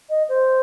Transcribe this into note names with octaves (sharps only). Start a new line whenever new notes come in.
D#5
C5